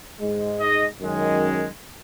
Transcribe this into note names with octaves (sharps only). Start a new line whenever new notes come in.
G#2 G#3
D#5
F#2 D#3 G#3